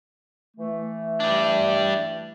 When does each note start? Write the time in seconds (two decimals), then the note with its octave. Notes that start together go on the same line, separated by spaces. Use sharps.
0.57 E3 A3
1.20 G3 D4